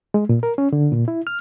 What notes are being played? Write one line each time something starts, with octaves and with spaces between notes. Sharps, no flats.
G#3
A#2
A#4
C#4
D3
A#2
E4
F6